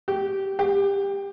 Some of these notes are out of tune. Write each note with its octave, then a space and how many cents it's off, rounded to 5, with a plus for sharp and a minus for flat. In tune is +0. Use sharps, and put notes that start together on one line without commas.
G4 -10
G4 +20